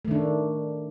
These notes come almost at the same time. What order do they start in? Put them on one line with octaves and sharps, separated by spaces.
A3 D#3 D4